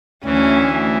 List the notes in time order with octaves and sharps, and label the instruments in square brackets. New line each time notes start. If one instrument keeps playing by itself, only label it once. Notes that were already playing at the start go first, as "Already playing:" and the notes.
[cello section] D2 [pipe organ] E3 [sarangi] C#4